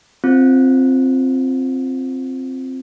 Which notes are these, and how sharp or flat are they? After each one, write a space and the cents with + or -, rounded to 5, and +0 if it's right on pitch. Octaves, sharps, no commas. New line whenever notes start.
C4 +0 F4 +0